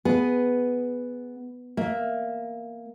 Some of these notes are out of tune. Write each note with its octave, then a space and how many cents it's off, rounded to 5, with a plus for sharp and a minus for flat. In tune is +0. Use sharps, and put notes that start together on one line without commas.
B3 +0 G#4 +0
A#3 +0 E5 +0